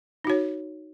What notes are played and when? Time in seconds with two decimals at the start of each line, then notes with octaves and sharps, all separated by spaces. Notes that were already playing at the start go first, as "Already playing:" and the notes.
0.24 D#4
0.27 F#4
0.30 C#5